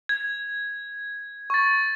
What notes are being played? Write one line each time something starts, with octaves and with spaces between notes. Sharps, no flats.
G#6
C#6 A6